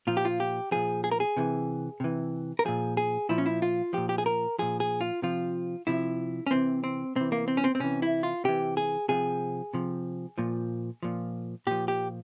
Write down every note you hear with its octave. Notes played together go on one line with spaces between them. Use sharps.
A#2 F3 F4
G4
F4
G4
A#2 F3 G#4
G#4
A#4
G#4
C3 E3
C3 E3
A#4
A#2 F3 G#4
G#4
A#2 F3 E4
C#4
E4
F4
A#2 F3 G4
G4
G#4
A#4
A#2 F3 G#4
G#4
F4
C3 F3 F4
C3 F3 E4
C#4
C3 E3 C4
C4
C3 E3 C4
A#3
C4
C#4
C4
C4
C3 E3 C#4
E4
F4
C3 E3 G4
G#4
C3 F3 G#4
C3 F3
A#2 F3
A#2 F3
A#2 F3 G4
G4